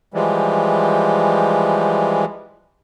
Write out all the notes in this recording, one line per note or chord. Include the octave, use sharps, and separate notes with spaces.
E3 F3 G3 G#3